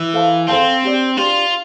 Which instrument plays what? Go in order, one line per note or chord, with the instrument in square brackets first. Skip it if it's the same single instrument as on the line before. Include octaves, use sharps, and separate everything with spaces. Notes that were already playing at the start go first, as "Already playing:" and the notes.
Already playing: [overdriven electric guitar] E3
[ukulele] A4 C5 F5 A5
[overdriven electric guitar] C4 [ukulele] A4 C5 F5 A5
[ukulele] D4 G4 D5
[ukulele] D4 G4 D5 [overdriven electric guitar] F4